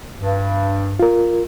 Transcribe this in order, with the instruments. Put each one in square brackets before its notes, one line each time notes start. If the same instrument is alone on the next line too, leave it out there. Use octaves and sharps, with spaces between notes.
[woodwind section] G2
[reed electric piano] F4 A#4